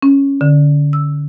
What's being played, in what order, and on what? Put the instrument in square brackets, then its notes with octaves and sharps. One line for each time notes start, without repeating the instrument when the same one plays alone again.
[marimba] C#4
D3
E6